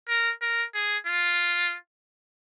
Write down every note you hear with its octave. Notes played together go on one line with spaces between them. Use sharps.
A#4
A#4
G#4
F4